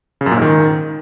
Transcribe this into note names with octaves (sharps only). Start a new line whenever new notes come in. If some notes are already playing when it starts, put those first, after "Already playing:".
C#3
F#2
A#2
G#2
D#3